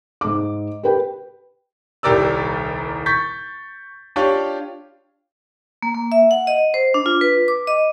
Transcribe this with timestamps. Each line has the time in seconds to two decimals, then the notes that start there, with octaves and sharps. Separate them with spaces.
0.21 G#2 D6
0.83 G4 A#4 B4 G5
2.03 D#1 C2 G4 A#4 D5 E6
3.06 C#6 G6 A6 B6
4.16 D4 F4 G4 C#5
5.82 A#3
5.95 A#3
6.12 E5
6.31 F#5
6.47 D#5
6.74 C5
6.94 D4
7.06 F4
7.21 B4
7.48 D6
7.67 D#5